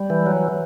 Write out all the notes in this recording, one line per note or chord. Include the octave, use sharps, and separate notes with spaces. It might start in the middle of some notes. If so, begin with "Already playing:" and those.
Already playing: G3
E3
F#3